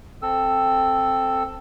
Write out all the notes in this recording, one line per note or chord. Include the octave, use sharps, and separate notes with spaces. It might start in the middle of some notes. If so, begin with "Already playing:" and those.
C4 A4 E6